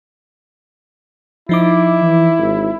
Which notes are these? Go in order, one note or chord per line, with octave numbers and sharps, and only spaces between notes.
F3 D#4 E4 D6
E3
G#1